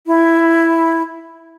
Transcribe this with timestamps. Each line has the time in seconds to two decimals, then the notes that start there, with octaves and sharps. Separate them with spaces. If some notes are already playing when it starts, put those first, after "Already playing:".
0.07 E4